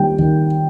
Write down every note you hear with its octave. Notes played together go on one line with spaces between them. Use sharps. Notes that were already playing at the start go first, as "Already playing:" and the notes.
Already playing: D#3 G3 A#3 G5
D#3